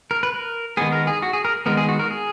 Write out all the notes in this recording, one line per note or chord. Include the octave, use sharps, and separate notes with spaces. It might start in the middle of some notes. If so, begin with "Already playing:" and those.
A#4
B4
A#4
D#3 G#3 B3 G#4
A#4
G#4
F#4
G#4
A#4
D#3 G#3 B3 A#4
G#4
F#4
A#4
G#4